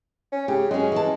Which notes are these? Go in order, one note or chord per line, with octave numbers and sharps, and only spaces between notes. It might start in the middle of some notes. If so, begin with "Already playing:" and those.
C#4
C#3 G4
F#3 G#3 C#4
E3 A5